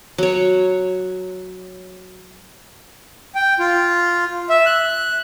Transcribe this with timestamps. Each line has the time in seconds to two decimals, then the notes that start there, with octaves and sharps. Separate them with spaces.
0.18 F#3 C#5
3.35 G5
3.60 F4
4.49 E5
4.66 F#6